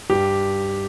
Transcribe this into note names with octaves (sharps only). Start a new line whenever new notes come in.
G2 G4